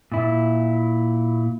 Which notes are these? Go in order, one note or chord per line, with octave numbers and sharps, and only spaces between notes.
A#2 E4